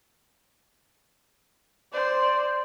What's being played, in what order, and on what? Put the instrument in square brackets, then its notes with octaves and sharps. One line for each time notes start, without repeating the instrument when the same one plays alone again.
[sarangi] C5 [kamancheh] D5